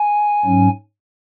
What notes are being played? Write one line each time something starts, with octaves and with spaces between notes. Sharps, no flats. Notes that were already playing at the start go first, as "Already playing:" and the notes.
Already playing: G#5
G#2 F#3 C#4